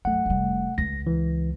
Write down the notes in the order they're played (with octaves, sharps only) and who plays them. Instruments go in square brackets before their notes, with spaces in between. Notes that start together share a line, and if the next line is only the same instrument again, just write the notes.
[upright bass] F#2 [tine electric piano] A3 F#5
[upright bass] F1 G3
[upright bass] C#2 [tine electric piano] A#6
[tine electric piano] E3